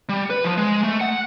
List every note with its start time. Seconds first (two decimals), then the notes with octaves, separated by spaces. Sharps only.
0.09 G3
0.30 B4
0.44 F3
0.57 G#3
0.84 A3
1.01 F#5